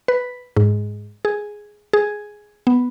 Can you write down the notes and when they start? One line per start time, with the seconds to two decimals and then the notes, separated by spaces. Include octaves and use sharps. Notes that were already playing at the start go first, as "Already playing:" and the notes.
0.08 B4
0.57 G#2
1.25 G#4
1.93 G#4
2.67 B3